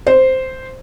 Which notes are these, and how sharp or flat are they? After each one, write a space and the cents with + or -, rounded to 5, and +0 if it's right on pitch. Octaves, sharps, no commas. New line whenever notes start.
C5 -5